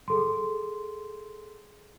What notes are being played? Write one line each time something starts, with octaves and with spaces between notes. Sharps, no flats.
G#4 A4 C6